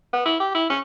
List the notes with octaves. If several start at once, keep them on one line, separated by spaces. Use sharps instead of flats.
B3
E4
G4
E4
C#4